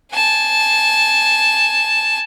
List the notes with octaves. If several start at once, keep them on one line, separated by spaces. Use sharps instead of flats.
G#5 A5